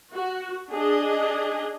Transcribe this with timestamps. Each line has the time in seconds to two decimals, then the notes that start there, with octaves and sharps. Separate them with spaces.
0.13 F#4
0.71 D4 G#4 D#5